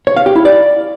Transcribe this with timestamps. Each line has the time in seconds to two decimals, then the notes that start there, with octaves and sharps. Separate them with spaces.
0.07 C#5
0.17 F5
0.26 G4
0.36 E4
0.45 D5